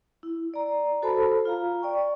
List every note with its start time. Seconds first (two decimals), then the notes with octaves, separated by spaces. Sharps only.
0.23 E4
0.54 D5 A#5
1.02 F#4 A4 C5 A5 B5
1.45 F4 F5 A#5
1.82 D5 G5 C#6